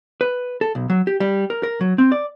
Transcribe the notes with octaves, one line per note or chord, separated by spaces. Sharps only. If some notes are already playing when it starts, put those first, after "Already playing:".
B4
A4
B1
F#3
G4
G3
A#4
A#4
F#3
C4
D5